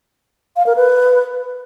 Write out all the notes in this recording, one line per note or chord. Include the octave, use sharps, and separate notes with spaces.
F5
A#4
B4